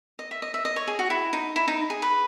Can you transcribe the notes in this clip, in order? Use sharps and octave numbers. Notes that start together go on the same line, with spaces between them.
D#5
E5
D#5
E5
D#5
C#5
G#4
F#4
E4
D#4
E4
D#4
G#4
B4